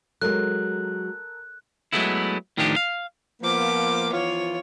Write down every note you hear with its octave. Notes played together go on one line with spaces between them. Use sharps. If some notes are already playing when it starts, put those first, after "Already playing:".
F#3 G#3 A4 A#4 F#6
F#3 G#3 A3 B3 E4
A2 D#3 F3 D4 D#4 G4
F5
F3 A#3 B3 D6
E3 F3 F4 C#5